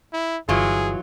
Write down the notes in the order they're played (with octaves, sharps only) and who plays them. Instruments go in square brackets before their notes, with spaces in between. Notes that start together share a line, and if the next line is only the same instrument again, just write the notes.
[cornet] E4
[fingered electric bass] G1 [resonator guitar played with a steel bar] E3 F#3 F4 [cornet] G#4